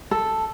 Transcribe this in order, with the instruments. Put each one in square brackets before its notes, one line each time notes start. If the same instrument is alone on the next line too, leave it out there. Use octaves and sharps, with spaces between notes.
[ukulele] A4